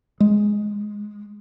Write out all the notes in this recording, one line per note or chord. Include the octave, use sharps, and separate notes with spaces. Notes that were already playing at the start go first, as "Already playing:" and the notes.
G#3